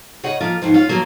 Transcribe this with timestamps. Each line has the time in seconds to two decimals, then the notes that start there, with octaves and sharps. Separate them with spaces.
0.24 C#3 C#5 D#5 F#5
0.41 F3 A#3 F4 A#4
0.62 D#2 G#2 F3 C5
0.74 C#4 F4 F5
0.89 F3 F#3 A#3